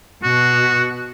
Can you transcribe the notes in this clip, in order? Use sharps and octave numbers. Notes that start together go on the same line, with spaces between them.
B2 F#4